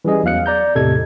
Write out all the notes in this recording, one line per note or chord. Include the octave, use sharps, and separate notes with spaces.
E3 G3 C#4 G#4 D#5
E2 F#3 B3 F5 F#6 C#7
D5 A#5 G6
E2 A2 C3 A4 D#5 G#6